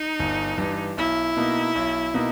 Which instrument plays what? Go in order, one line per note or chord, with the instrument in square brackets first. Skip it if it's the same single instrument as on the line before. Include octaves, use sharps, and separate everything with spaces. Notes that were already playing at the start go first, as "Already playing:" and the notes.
Already playing: [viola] D#4
[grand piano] G1
G2 E3
[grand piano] B1 [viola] E4
[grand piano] B2 A#3 D#4
B1
B2 A#3 D#4